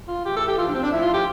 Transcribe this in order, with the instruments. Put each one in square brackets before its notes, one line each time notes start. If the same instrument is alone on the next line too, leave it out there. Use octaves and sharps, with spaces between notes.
[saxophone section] F4
A2 E3 G4
A4
G4
A2 F3 F4
D4
C4
D4
A2 F3 E4
F4
G4